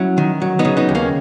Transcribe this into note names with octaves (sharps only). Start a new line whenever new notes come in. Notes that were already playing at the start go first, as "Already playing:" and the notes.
Already playing: F#3 C#4 E4
D#3
F#3
B3 D#4
C#3
B3 D#4
D#2
A#3 C#4